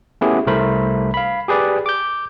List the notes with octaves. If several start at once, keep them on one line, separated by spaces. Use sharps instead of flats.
A3 B3 C#4 E4 G4 G#4
C2 A3 A#4 C5 B5
F5 B5
G4 G#4 B4 D5
D6 G6